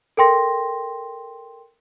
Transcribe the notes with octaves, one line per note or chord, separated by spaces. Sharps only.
A4 A#4 G5 C6 A#6